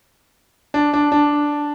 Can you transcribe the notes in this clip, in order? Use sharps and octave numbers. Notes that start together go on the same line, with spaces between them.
D4
D4
D4